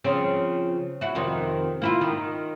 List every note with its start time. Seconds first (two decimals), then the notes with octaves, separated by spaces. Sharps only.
0.04 C#3 F3 C4
1.01 E4 F#4
1.15 F2 C3 D#3
1.82 A#3 E4 F4
2.01 D#3